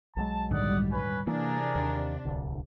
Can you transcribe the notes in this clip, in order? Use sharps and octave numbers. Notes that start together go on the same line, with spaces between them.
B1 F#3 G#3 A5
D#1 G#2 D3 G3 D5 F#5 D#6
C#4 B4
C3 E3 A#3 D4 G#4 A#4
D#2
D1 C2 D3